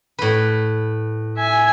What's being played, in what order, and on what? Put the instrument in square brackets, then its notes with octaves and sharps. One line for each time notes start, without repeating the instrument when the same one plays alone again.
[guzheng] A2 B4
[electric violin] E5 G#5